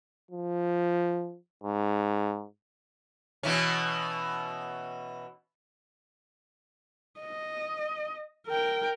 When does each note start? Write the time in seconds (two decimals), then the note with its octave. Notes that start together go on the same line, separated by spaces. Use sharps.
0.31 F3
1.64 G#2
3.43 B2 E3 C#4
7.19 D#5
8.47 A#4 G5